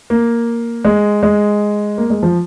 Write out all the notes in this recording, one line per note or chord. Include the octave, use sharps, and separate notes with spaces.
A#3
G#3
G#3
A#3
G#3
F3